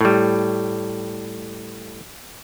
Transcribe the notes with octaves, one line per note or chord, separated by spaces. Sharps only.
A2 G3